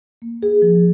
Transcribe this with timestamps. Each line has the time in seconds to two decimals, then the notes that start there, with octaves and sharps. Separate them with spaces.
0.22 A#3
0.43 G#4
0.62 F3